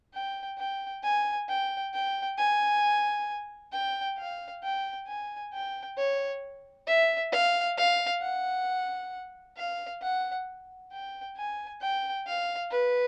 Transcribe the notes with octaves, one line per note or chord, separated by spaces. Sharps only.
G5
G5
G#5
G5
G5
G#5
G5
F5
G5
G#5
G5
C#5
E5
F5
F5
F#5
F5
F#5
G5
G#5
G5
F5
B4